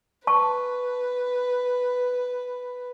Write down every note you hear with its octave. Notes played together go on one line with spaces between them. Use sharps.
B4 A5 C#6